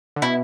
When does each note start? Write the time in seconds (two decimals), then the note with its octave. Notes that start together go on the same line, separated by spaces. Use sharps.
0.16 D3
0.22 B2 E4